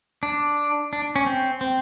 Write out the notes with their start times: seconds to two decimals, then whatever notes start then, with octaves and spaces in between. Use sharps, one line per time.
0.23 D4
0.93 D4
1.16 C#4
1.26 C4
1.61 C4